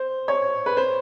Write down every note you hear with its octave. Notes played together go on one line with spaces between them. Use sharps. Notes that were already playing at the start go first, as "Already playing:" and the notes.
Already playing: C5
C#5
B4
C5